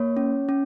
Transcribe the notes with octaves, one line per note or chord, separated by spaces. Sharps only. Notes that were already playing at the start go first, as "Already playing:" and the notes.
Already playing: A#3 C#5
C#4
C#4